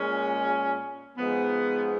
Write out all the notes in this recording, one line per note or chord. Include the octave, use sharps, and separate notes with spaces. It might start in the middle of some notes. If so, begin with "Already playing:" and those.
Already playing: A#2 G#3 C#4
G#2 F3 G#3 B3